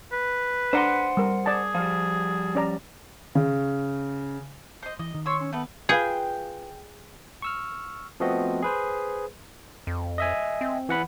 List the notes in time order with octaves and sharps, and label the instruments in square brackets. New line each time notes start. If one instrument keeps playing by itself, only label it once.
[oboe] B4
[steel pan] D4 D5 A#5 [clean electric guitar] C5 F#5 C6
[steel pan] G3 A#4
[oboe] G#4 [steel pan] D5 A5
[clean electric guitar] F3 G3 [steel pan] F5
[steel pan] C#4 D5 A#5
[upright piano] C#3
[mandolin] C5 D#5
[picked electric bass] E3 [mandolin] D#5
[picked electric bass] D#3
[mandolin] C#5 E6 [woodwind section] C6 C#6
[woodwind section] C#4
[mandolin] A3 B4 [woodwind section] B3
[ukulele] F4 B4 F5 [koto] G#4 [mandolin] G5
[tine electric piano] C#6 E6 F6
F3 A3 B3 C4 F#4 D#5
G#4 B4 C5
[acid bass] F2
[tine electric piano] D#5 E5 G#5
[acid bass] C4
[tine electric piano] E3 F#5 B5